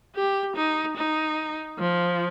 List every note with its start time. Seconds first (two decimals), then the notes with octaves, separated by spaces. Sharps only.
0.15 G4
0.56 D#4
0.97 D#4
1.79 F3